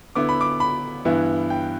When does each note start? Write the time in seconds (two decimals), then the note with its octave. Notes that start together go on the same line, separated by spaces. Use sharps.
0.15 D3 B3 E4 D6
0.29 B5
0.41 D6
0.60 B5
1.05 G2 E3 B3 E4
1.50 G5